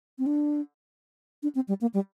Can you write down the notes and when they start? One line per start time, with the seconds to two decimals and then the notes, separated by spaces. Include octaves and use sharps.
0.19 C4
0.26 D4
1.43 D4
1.55 C4
1.68 G3
1.81 A#3
1.94 G3